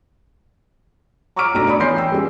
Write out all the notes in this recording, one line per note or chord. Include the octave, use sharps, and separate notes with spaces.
A#5 C#6 D6 E6 F6 D7
B1 A3 D4 A#5 A#6 D7
C#5 D5 B5 D#6
E3 C6 G6 C7
G5 E6
G3 G#3 C#4 G4